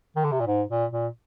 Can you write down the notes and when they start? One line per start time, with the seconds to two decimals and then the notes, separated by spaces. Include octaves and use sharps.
0.16 D#3
0.24 D3
0.32 C3
0.40 A#2
0.47 G#2
0.69 A#2
0.92 A#2